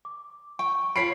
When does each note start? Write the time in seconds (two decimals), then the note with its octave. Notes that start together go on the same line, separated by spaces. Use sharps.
0.05 D6
0.59 G5 C#6
0.96 F4 C#5 B5 B6 C7 D7